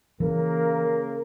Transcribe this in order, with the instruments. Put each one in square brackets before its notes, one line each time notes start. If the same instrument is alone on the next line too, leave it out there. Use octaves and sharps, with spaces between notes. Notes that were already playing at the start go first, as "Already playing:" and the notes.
[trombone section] C#3 A#3 A#4 [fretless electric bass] E3